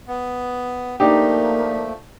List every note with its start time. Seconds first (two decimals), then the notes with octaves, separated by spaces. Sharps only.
0.08 B3
1.00 F3 A3 A#3 D4 D#4 G4